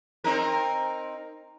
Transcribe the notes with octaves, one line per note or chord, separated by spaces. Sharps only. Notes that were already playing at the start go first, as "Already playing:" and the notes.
C4 D#4 A#4